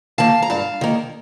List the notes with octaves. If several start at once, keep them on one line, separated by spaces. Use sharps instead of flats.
D#3 A#3 F5 A5
A#5
G2 F5 A5
D#3 A#3